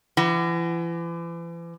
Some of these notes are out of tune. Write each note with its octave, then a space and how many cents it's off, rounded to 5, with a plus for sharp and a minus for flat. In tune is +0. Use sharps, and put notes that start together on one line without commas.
E3 +40 F#5 +30